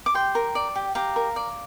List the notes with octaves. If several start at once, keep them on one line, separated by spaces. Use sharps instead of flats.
D6
G4 G5 C6
A#4
D5
G4
G4 F5 A#5
A#4
D5